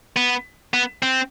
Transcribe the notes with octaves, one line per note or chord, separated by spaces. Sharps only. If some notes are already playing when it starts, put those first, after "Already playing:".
B3
B3
C4